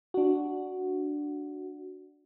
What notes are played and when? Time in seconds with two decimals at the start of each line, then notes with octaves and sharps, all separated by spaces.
0.14 D4 F#4